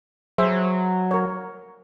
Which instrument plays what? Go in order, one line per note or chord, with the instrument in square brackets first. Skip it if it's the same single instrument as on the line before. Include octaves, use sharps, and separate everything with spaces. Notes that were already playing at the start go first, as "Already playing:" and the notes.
[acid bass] F#3 [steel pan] G#4 C5 E5
[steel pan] A#4 C#5